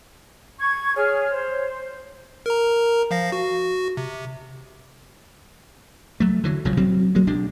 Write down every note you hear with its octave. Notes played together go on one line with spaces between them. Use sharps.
C#6 G#6
G#4 C#5 F6
C5
A#4 A#5
F3 F5 A#6
F#4
C3
F#3 A3
D3 E3 F#3
B1 C#3 F3 F#3
F#3 G3 C4
F#3 G#3 A#3
B1 C3 G#3 D4